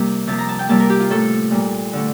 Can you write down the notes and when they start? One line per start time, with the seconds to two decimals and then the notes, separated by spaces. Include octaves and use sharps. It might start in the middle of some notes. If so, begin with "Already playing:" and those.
Already playing: C3 G3 A#3
0.27 C3 F3 A#3 A5
0.38 A#5
0.49 A5
0.59 G5
0.69 C3 G3 A#3 A5
0.80 A#4
0.90 G4
1.00 F4
1.10 A2 A3 A4
1.51 A#2 G3 A#3
1.93 D3 A3